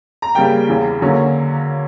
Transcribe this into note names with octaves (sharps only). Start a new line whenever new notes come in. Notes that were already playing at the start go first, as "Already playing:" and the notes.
A#5
C#3 G3 A#3 G5
E2 C#3 E3
D3 F#3 A#3 C#4